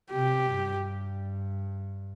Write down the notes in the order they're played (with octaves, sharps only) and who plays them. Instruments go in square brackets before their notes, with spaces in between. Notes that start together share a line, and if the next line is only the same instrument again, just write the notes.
[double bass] C3 [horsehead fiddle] G4
[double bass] G2